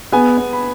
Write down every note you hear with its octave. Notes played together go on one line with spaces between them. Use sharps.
B3 G#4 G#5
B3
B5